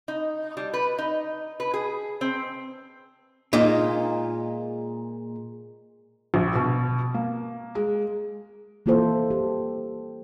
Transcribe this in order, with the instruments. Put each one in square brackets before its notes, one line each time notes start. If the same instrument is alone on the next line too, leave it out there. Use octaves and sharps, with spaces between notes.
[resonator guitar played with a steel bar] D#4
G3
B4
D#4
B4
G#4
C4
[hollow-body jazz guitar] A#2 G#3 D#4 F4
[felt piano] A#1
B2
A#3
G#3
[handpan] E3 A#3 E4 F4 A4 C5
G4